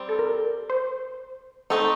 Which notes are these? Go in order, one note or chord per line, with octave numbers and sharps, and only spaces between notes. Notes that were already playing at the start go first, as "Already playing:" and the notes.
Already playing: G3 C4
A4
A#4
C5
A3 C4 D#4 A4